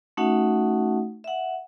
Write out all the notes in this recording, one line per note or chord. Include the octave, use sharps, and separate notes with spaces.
A3 C#4 D#4 F#4 E5 F#5
E5 F#5